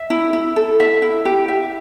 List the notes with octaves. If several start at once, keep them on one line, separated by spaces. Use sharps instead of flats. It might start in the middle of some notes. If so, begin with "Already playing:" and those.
Already playing: E5
E4
E4
A4
E5
E4
G4
E5